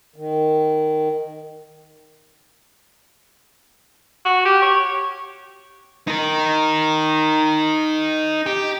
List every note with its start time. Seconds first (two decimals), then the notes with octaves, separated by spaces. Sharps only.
0.16 D#3
4.25 F#4
4.45 G4
4.62 C#5
6.08 D#4 A#4
8.46 G4